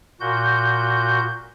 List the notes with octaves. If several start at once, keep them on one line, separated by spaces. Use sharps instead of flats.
A#2 F#4 G6